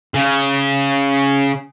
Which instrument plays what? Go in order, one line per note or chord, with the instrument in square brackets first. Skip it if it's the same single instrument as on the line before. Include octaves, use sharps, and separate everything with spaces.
[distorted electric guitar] C#3